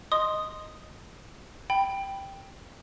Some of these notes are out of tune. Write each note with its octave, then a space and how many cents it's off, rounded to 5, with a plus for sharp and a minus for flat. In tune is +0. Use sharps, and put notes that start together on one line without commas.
D#5 +0 C6 +0 D#6 -5
G5 +0 B5 +0